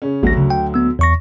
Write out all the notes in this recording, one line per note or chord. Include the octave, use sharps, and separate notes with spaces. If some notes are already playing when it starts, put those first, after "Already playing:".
C#3 C#4
A1 D2 F#3 A#6
C#3
G5
B3 E6
E2 C#6 A#6